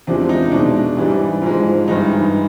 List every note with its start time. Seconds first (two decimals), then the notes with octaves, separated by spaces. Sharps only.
0.07 E2 C3 F3 G#3 D4
0.29 D#4
0.51 B2 G#3 D4
0.97 G#2 E3 G3
1.42 G#2 F3 G#3
1.87 G2 E3 G#3 D#4
2.10 D#4